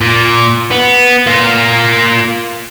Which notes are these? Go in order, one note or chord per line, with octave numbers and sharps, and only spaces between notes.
A#2
B3
A#3 F4